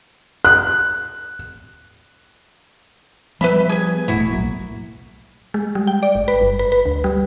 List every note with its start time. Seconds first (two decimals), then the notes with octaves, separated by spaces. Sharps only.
0.45 F#6
3.41 F3 G3 B3 B4 E5 B5
3.69 G#4 G#5
4.08 E1 A2 A3 E4 F#4
4.31 B1 F#3 A#3
5.54 G#3
5.75 G3
5.87 G5
6.03 D5
6.15 G#1
6.28 B4
6.41 G1
6.59 B4
6.72 B4
6.86 D2
7.04 G3